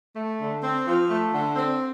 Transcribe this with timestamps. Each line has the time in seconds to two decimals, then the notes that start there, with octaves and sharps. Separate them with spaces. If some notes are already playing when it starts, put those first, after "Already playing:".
0.16 A3
0.40 D3
0.63 C4
0.86 F3
1.09 A3
1.32 D3
1.56 C4